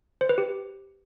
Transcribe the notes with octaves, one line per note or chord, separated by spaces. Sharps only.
C5
B4
G4